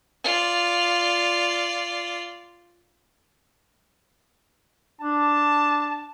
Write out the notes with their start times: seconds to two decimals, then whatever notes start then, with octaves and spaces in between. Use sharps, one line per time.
0.24 F4 D5
5.01 D4 A5